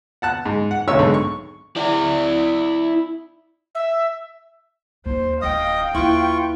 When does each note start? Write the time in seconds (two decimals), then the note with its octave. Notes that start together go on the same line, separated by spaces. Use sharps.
0.22 F#5 A5 F#6
0.46 G#2
0.71 F#5
0.88 B1 D3 A3 C#5 C#6 E6
0.99 G#2 D3
1.14 C#6
1.76 E4 D5
3.75 E5
5.06 D#2 D#4 C5
5.42 D1 D2 D#5 F5 G5 D#6
5.95 D#2 E4 F4 B4 C#6